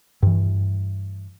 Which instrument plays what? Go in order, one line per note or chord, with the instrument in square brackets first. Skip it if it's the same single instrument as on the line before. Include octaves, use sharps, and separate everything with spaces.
[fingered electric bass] G2 E3